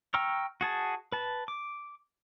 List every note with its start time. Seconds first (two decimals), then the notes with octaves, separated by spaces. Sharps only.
0.14 G5 A#5 C#6 E6 F6
0.61 F#4 G#4 A5
1.12 B4 A5
1.48 D6